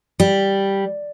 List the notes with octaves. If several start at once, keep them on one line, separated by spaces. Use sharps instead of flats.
G3